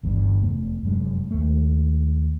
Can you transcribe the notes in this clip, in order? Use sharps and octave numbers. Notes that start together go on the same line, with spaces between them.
G1 E2 G2
F1 E2 A3
F1 F#2 G#3
D#2 A3